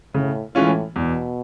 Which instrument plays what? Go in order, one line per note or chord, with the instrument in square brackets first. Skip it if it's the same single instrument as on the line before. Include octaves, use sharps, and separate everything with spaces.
[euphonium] A2 [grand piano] C#3
[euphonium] A2 [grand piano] E3 G#3 C#4 F4
[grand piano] E2 [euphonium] B2